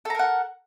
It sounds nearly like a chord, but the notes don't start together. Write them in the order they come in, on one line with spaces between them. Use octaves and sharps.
A4 A#5 A#4 F#5